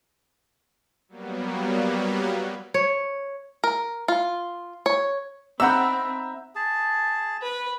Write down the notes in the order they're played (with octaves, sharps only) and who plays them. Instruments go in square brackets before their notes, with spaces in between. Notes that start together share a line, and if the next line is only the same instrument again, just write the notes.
[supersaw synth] F#3 G3 A#3 B3
[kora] C#5
[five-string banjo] A#4
F4
C#5
[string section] C4 [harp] D#4 F#5 B5 [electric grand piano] E5 A#5 G6 [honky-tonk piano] E6
[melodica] G#4 A5
[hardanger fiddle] B4